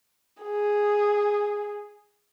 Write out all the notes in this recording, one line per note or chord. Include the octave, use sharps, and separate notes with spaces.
G#4